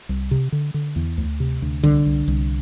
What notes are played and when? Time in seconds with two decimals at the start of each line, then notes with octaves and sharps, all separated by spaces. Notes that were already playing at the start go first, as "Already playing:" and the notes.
0.09 C2
0.31 C3
0.52 D3
0.74 D3
0.96 E2
1.18 D2
1.40 C3
1.62 D2
1.83 C2 D3
2.06 C2
2.28 C2